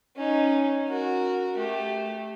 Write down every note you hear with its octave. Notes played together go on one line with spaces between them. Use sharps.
C#4 D#4
F#4 A#4
A3 G4